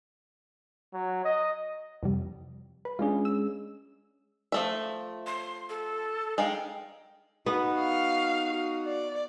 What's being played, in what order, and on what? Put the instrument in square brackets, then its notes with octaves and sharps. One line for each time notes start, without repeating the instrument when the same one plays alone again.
[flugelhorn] F#3
D#5
[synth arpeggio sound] F2 C3 G3
B4
[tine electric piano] G#3 C#4 G#4 [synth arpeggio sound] D4 F4
[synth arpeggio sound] E6
[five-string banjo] F3 A3 E5
[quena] C6
A4
[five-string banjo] G#3 D#4 F5 [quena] G5
[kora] B3 [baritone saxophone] D#4 [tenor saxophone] F#4
[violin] F5
[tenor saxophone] F#4
[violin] D5